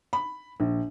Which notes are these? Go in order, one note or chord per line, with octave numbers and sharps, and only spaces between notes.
B5
A#1